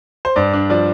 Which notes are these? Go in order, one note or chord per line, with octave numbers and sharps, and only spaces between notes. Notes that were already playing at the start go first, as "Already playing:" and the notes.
C5
G2 D5
D4
F3 D5